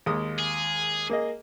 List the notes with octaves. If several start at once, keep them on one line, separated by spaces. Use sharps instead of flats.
D#2 G#3 D#6
G#4
A#3 G#4 D#5